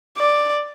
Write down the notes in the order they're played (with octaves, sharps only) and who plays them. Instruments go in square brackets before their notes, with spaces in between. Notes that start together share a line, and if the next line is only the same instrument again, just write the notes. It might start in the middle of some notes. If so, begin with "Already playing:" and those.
[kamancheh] D5